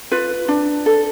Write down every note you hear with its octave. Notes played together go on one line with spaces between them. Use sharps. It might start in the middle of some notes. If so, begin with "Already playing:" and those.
F4 B4
D4
A4